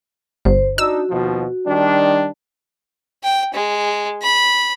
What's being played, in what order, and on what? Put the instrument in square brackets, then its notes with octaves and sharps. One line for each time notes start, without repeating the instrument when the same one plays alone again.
[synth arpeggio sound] G1 [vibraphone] C5
[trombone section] D4 D#4 [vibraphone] F#4 [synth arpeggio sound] E6
[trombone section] D#2 B2 F3
D#3 G3 D4
[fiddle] G5
G#3
B5